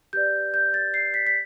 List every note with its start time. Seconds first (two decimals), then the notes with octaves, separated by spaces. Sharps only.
0.13 G4 B4 D5 G6
0.54 G6
0.74 A6
0.94 C7
1.14 B6
1.27 B6